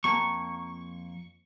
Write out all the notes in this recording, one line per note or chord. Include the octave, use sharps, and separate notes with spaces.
F2 A#3 A5 C#6